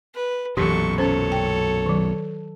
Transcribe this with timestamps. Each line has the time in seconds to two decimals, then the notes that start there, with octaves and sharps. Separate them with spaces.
0.15 B4
0.57 B1 F#2 A#2 E3 G4 A4 C#6
0.98 C#4 A4 C5 C#5
1.32 G5
1.86 D#3 F#3